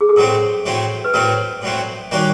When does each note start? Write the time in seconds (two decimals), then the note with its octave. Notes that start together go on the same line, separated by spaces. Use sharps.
0.01 G#4
0.09 A4
0.16 A2 F#3 A3 C4 A#4
0.65 A2 F#3 A3 C4
1.05 B4
1.14 A2 F#3 A3 C4 A#4
1.62 A2 F#3 A3 C4
2.12 D#3 G3 A#3 C#4 F#4